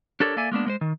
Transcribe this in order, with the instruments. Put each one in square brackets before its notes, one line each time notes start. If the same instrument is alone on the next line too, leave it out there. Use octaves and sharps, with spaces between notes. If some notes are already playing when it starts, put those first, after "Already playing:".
[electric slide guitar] D4 G4 A4 A#4 C#5 D5
A#3 A4 D5 E5 G#5
G#3 A#3 B3 D4
G#3 B4 C5
D#3